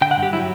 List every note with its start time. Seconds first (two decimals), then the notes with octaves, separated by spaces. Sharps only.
0.01 D3 G5
0.11 F#5
0.17 G2
0.23 G4
0.33 F#3 E4